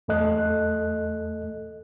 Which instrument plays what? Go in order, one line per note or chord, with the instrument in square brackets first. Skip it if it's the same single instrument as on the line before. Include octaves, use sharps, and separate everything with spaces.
[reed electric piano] E2 A3 A4 D#5 F#6